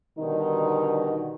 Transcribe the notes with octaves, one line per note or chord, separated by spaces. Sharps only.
B2 D3 D#3 G3 D#4